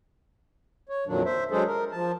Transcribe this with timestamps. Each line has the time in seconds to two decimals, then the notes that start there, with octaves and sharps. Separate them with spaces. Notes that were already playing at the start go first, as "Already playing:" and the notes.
0.89 C#5
1.07 F2 A#2 D#3 F#3 D4
1.25 C5 E5
1.51 F#3 G#3 D4 G#4 A4 C5
1.66 A#4
1.92 F3 A5